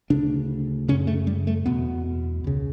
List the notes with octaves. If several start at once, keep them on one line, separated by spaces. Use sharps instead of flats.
D2 C#3 D4
F#2 C#3 C#4
A3
G3
A3
E2 B2 B3
C#2 C#3